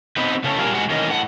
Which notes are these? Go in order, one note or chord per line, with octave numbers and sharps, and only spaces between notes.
B3 C4 D#4 B4
C#3 A3 C#4
A#2 G3 D4 F4 G#4 A#4
G#2 G#3 F#4 F#5
D#3 E3 A#3 C#4 D#5
A2 F#5